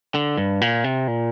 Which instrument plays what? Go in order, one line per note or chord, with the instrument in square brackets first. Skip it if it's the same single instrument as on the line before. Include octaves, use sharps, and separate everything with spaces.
[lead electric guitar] D3
G2
A#2
C3
A#2